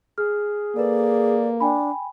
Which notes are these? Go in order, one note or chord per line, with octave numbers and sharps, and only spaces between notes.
G#4 F6
A#3 A4 B4 D5
D4 G5 G#5 B5